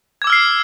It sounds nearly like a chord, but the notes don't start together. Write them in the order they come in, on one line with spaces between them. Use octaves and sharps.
G#6 D6 E6 F6 C7